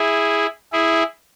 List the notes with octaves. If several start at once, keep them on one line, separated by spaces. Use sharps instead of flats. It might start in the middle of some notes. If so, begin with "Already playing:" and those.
Already playing: E4 G#4
E4 G#4